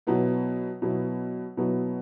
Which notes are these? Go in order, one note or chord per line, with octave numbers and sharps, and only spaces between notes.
B2 F#3 B3 E4
B2 F#3 B3 E4
B2 F#3 B3 E4